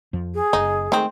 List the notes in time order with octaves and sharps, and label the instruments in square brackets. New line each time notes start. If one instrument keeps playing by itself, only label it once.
[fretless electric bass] F2 F3
[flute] G#4
[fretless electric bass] F#1 [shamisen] D#4
[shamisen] D#3 G#3 C4 [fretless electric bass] A3